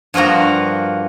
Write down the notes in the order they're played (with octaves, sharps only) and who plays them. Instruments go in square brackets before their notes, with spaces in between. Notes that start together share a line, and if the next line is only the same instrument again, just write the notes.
[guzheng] G2 F3 A#3 F#4 A#5